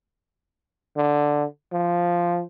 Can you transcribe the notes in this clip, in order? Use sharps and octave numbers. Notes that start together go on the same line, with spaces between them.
D3
F3